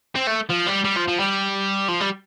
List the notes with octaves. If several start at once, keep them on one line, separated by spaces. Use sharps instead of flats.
C4
A3
F3
G3
G3
F3
F3
G3
F3
G3